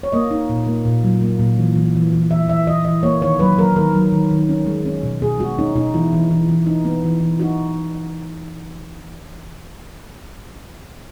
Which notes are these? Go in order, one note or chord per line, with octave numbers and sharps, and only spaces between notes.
C#5
A#3 D#5
D#4
A#2
A#3
A#2
F#3
A#3
A#2
E3
E3
E3
E3
E3 E5
E3 E5
E3 D#5
E3 D#5
A#3 C#5
D#3 C#5
F#3 B4
F#3 A#4
D#3 A#4
F#3
D#3
D#3
C#4
G#3
C#4
B2
B2 G#4
G#3 F#4
C#4 D#4
B2 D#4
E3 E4
E3
E3
E3
D#4
B3
E3
E3
D#4 F#4